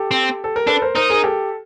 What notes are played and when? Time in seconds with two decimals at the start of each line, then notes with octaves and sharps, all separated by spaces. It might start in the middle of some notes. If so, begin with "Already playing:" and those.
Already playing: G4 A4
0.11 C4
0.44 A4
0.56 A#4
0.67 D4 A4 B4
0.82 A#4 C5
0.95 D#4 A#4 C5
1.09 G#4 A#4
1.24 G4 A4